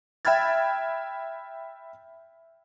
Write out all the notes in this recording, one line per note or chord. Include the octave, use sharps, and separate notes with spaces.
E5 G5 B5 F6 G#6 A6